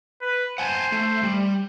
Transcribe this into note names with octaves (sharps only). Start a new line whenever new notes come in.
B4
C5 F#5 G#5 A5
A3
G3